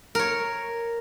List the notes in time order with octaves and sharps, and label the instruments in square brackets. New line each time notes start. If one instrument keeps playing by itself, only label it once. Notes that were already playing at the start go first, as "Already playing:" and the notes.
[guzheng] A#4 C#5